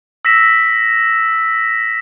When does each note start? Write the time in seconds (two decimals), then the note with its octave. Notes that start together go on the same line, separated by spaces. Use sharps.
0.25 E6 A#6 B6 E7